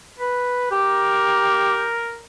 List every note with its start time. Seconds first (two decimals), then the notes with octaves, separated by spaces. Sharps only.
0.20 B4
0.71 G4 A#4